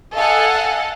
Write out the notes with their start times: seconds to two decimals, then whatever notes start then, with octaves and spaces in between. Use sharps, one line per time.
0.15 A4 D#5 F5 F#5 G#5 A5